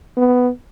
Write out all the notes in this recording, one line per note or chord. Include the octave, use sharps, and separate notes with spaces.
B3